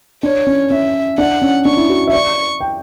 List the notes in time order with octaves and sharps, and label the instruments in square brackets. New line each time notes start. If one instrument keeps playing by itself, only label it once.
[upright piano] D4 [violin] C#5
[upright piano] C#4
[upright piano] C#4 [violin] E5
[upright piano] D4 [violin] F#5
[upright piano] C#4
[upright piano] D4 [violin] C#6
[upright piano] E4
F#4
E5
[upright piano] D5 [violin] C#6
[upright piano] G5